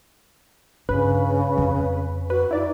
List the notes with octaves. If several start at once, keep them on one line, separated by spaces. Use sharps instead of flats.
G2 C#3 D4 B4
F2
F#4 B4
D#4 E4 D5